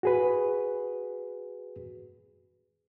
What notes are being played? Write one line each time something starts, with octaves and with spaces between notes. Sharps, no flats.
F#4 G#4 B4